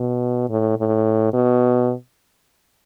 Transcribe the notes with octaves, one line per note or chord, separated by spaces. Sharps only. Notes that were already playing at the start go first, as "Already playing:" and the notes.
Already playing: B2
A2
A2
B2